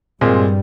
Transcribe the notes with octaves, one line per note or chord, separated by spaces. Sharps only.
G2 A#2 G3 G#3 C4